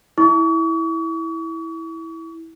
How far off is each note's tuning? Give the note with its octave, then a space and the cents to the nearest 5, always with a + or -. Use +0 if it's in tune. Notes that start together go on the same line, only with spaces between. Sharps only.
E4 -10 C#6 +40